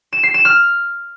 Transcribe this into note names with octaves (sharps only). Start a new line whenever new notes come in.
E7
C7
E7
F6